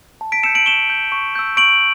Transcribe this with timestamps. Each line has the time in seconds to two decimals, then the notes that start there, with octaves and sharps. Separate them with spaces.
0.21 A5
0.32 B6 D7
0.43 E6 G6 C#7 E7
0.55 D7 F#7
0.66 C#6 E7 G7
0.90 G6
1.12 C#6
1.35 E6 G6
1.57 C#6 D7 F#7